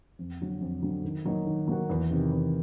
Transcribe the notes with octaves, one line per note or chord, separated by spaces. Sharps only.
F2
D3 F#3
F2
D3 F#3
D#3
F#3 A#3 D#4 F#4
D#3
F#3 A#3 D#4 F#4
E2
C3 D#3
E2